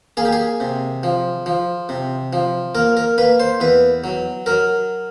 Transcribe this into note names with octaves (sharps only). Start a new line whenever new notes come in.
A#3 G#4
G4
G#4
C3
F3
F3
C3
F3
A#3 A#4
A#4
A#3 B4
C5
E2 B4
F#3
F#3 A#4